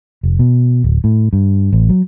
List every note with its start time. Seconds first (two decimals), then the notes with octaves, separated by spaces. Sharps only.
0.23 F1
0.39 B2
0.84 D1
1.04 A2
1.33 G2
1.73 A1
1.90 F#3